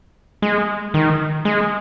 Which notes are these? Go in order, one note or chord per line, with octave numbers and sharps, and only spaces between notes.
G#3
D#3
G#3